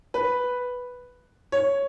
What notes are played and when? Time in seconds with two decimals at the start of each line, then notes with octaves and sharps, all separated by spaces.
0.14 B4
1.52 C#5